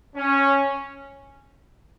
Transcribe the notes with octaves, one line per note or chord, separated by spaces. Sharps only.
C#4